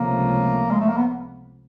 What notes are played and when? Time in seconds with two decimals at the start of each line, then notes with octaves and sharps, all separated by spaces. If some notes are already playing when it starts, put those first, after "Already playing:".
Already playing: C#2 C3 F3 A3 A#3 C#4
0.71 G#3
0.80 A3
0.89 A#3
0.97 B3